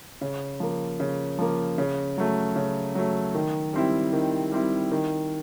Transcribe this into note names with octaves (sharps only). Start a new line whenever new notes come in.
C#3
F3 A#3
C#3
F3 A#3
C#3
F#3 A3
C#3
F#3 A3
D#3
G3 C4 E4
D#3
G3 C4 E4
D#3